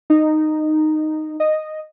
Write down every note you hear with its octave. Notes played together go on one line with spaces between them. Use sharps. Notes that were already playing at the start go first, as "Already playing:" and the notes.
D#4
D#5